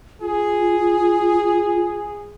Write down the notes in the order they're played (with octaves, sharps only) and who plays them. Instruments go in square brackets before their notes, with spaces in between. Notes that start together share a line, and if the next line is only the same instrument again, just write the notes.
[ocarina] F4 [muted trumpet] G#4